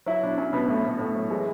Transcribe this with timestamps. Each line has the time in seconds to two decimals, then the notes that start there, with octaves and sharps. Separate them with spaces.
0.06 F#3 E4
0.23 B2 D4
0.37 F#3 C#4
0.53 B2 B3
0.68 A2 A3
0.85 A2
0.99 A2
1.15 F#3
1.30 E3 G#3